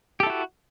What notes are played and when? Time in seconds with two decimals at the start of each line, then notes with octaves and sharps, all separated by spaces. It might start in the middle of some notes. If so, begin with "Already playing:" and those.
0.20 G4
0.23 A4
0.26 E4
0.30 F#4